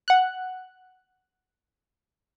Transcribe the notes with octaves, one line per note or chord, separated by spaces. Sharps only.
F#5 F#6